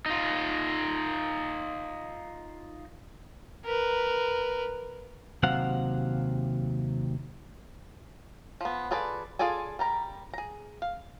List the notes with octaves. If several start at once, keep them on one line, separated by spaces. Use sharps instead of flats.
D#4 F4
A#4 B4
D#2 C3 F#3 C5 F5 F#5
F3 B3
F4 G#4 A4 B4 D5
F4 G#4 A4 D5 G#5
G3 A#4 A#5
G#4 A#5
F5